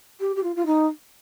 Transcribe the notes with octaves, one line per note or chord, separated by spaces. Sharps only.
G4
G4
F4
F4
D#4